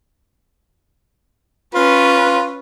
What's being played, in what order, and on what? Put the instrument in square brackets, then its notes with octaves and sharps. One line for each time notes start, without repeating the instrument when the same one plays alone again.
[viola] C#4 B4 [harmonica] F4